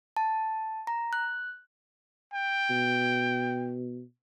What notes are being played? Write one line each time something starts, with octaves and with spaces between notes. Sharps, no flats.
A5
A#5
F#6
G5
B2